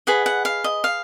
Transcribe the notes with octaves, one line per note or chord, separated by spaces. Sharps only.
G#4 B4 D#5 F#5
F#5
F5
D#5
F5